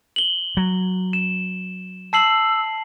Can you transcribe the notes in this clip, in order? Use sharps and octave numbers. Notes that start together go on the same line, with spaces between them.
F#7 G7
F#3
E7
A5 E6 C7 F#7